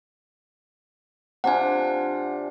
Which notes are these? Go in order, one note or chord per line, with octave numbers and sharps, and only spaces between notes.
C3 D4 F4 F#5 G#5